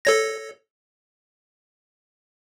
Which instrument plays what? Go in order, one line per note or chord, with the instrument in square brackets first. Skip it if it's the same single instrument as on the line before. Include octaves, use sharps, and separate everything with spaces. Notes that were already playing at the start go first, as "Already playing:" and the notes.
[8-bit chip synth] A4 C#5 A#6